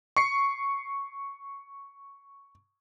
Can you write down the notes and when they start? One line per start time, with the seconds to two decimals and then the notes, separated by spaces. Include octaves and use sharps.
0.17 C#6 C7 C#7